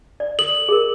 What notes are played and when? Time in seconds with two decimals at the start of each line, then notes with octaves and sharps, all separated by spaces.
0.20 D5
0.39 A4 F#7
0.69 G#4 A#4